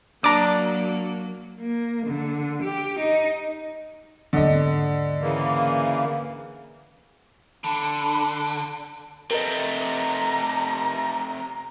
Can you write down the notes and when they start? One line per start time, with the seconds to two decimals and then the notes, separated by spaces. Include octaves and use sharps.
0.24 F#3 A#3 D4 A#5 D6
1.61 A#3
2.06 D3
2.62 G4
3.00 D#4
4.33 D#2 G#2 D3 D#5
5.20 C#3 E3 A#3
7.64 D3 A5 B5
9.31 C3 A3 A#4 B4 D#5 A#5